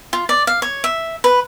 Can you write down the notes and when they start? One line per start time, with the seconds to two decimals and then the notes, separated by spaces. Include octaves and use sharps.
0.13 F4
0.29 D5
0.47 F5
0.62 C#5
0.84 E5
1.24 B4